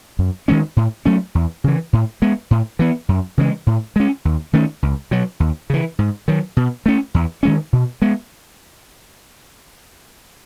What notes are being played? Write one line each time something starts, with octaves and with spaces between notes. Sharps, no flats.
F#2
D#3 G#3 C#4
A2
F#3 A3 C#4
E2
C#3 E3
A2
G#3 B3
A2
E3 B3
F#2
C#3 E3 G#3
A2
G#3 C#4
D#2
D#3 A3 C#4
C#2
B2 F#3
D#2
C#3 E3
G#2
D#3 F#3
B2
A3 C#4
E2
D#3 G#3 C#4
B2
G#3 B3